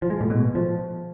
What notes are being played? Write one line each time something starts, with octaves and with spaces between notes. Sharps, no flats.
F3
G#3
A2
B2
F3